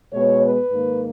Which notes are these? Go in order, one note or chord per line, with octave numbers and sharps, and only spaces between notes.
B2 G#3 B3 C#5
B4
G#2 D#3 A#3